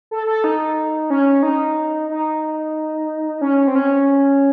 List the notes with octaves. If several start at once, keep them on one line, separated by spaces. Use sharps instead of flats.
A4
A4
D#4
C#4
D#4
D#4
C#4
C4
C#4